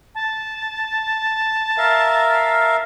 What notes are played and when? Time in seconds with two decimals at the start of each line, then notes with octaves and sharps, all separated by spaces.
0.15 A5
1.78 A#4 E5 F5